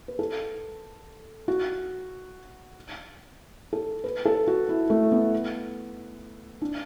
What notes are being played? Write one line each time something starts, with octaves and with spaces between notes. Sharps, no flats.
B4
A4
F#4
A4
B4
A4
F#4
E4
A3
B3
D4